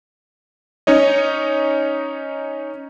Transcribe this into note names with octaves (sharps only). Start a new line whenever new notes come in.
C#4 D#4 C#5 D#5